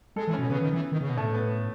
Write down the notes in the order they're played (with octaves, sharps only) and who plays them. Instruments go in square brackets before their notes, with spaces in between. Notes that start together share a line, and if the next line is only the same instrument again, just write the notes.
[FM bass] G#3 [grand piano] A4
[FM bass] E3
[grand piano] C#4
[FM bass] B2
[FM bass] C#3 [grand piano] B3
[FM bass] D#3
E3
D#3
C#3
B2
[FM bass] A2 [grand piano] A3
[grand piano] B3